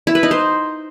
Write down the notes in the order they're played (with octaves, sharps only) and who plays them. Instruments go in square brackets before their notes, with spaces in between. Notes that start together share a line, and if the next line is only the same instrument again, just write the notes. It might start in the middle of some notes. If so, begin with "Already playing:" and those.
[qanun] E4
B4
D#4
C5